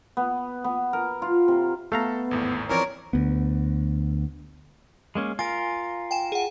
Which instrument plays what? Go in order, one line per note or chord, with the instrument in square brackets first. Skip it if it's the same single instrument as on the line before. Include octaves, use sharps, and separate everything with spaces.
[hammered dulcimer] B3
B3
A#4
F4
C3
[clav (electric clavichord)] A3 F5 A#5 [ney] B3 [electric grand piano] A4
[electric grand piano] G#1 E2 A2
[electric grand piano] E3 F3 C4 [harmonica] A#4 C#5 D5
[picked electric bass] D2 B3
[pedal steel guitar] G#3 A#3 C#4
[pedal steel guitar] F4 A#4 [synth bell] G#5
[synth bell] G5 G#5 E7
G#4 F#5